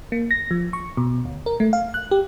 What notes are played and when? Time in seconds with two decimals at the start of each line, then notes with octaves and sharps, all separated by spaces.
0.12 A#3
0.31 A#6
0.51 F3
0.73 C#6
0.97 B2
1.25 D2
1.46 A#4
1.60 A3
1.73 F5
1.94 F#6
2.11 G4